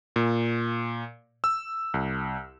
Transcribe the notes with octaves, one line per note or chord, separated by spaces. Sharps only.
A#2
E6
C2